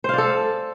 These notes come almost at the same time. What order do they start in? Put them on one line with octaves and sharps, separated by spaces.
C5 F5 D5 A4